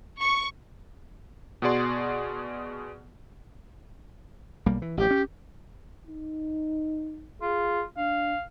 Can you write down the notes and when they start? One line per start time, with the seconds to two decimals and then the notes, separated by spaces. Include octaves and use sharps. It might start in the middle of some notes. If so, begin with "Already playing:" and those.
0.21 C#6
1.62 B2 B3 F#4 G#4 D5 C6
4.66 B1 G3 A#3
4.82 E3
4.97 A1 F3 G4
5.11 C#4
6.07 D#4
7.42 F4 G#4
7.97 D4 F5